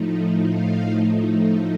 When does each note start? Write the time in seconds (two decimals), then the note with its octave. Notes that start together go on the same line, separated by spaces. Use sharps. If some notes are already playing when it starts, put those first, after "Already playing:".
Already playing: A2 F3 A3 D#4
0.44 F5